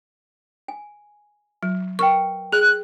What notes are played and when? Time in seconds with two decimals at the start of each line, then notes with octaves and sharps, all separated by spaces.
0.68 G#5
1.63 F#3
1.99 A#4 B4 G5 C#6
2.52 G#4 F#6